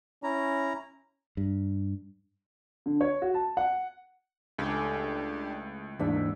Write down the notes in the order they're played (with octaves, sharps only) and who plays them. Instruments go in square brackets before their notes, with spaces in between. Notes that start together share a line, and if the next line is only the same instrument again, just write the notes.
[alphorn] C#4 [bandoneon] E4 A#5
[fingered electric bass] G2
[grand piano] D3
C#5
F#4
A5
F#5
[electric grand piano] C#2 [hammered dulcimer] A2 C#3 [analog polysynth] D4 G4
[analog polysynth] D#2 G#2 [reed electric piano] E3 D4 [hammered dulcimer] E5